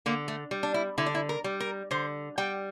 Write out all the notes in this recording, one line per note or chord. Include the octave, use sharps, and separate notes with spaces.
D3 A#3
A3
G3
D4
E4
D3 E4
D4
E4
A#4
G3
A#4
D3 C5
G3 G5